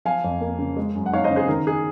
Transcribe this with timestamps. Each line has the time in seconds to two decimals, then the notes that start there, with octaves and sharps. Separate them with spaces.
0.05 F3 F5 G#5
0.24 F2
0.41 A#3
0.59 C#3
0.77 G#3
0.95 F#2
1.06 F#5
1.13 D#4 C#5 F5
1.24 C5 D#5
1.31 C#3
1.36 G#4 C5
1.48 D#3 A#4
1.67 G#4